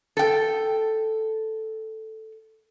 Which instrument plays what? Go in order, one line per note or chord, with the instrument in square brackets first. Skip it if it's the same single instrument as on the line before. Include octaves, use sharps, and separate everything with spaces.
[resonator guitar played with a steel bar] A4 G5